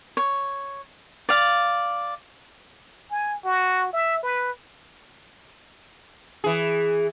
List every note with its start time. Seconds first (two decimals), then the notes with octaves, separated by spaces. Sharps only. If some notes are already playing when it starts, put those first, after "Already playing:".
0.17 C#5
1.29 D5 F5
3.11 G#5
3.45 F#4
3.93 E5
4.23 B4
6.44 E3 G#4